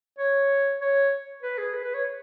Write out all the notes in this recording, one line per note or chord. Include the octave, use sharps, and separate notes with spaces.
C#5
C#5
B4
G#4
B4
B4
C#5